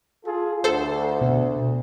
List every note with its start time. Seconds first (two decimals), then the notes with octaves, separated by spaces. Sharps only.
0.24 F4 G#4 A4
0.64 D2 A4 C5
1.21 B2